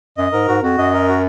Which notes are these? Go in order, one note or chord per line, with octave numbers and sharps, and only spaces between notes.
F#2 D#5
G#2 A#4
G#2 F#4
F2 F#4
F#2 D#5
A#4
F#4